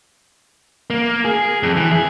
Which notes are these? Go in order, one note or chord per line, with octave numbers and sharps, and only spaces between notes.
A#3
G#4
F2
E3
G#4